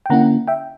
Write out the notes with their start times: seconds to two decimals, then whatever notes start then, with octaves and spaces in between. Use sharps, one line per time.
0.06 G5
0.10 D3 A#3 C#4 E4 F#5 A#5
0.48 E5 G5